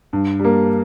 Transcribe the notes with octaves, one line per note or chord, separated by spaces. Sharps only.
G2
G3 A#3